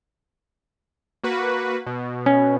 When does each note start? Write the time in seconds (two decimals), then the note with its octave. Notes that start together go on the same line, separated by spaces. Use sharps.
1.24 A#3 F#4 B4
1.86 B2
2.26 C#4